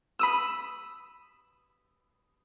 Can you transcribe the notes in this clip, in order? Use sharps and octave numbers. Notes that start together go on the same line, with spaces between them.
B5 D#6 E6